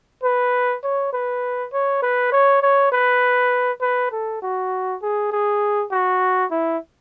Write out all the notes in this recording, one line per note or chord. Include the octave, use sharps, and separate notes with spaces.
B4
C#5
B4
C#5
B4
C#5
C#5
B4
B4
A4
F#4
G#4
G#4
F#4
E4